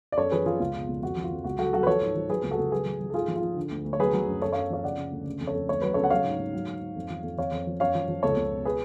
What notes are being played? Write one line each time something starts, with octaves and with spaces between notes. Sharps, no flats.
D5
F#2 A4 C#5
F3 G#4 B4
F3 F4 G#4
C#2 F4
B2
C#2
F2 F#4
F3
F4
F2
C#2 F#4
F#3 F#4 A4
F#3 F#4 A4
B4
F3 A4 C#5
G#2
F3
F#3 G#4 B4
C#2
F#4 A4
C#2
F#3 G#4 B4
F#3
F#3
A4
G#2 F4 G#4
F3
F4
F3
D3
D2
D2
C#5
F#3 G#4 B4
F#3
F#2
F#2 A4 C#5
F#2 C#5 F5
F3 C#5 F5
C#3 D5 F#5
C#3
D2
C#3
F2
A4 C#5
F2
D2 C#5
F#3 B4
C#3 A4 C#5
F#5
F#3 C#5 F5
G#2
G#2
F#3
G#2
G#2
F2
F3
F2
F2 C#5 F5
F2
F3
F#2 C#5 F5
F3
F3
C#2 A4 C#5
C#2
B2
G#4 B4